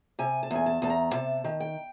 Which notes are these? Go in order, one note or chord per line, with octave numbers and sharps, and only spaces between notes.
C3 G#5
A5
E2 G#5
A5
E2 A5
A#5
C3 A5
D#3
G5